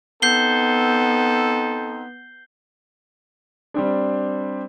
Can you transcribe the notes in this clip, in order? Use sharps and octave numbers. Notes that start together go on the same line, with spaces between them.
B3 C4 D#4 A4 G6 C7 G7
G3 C4 D4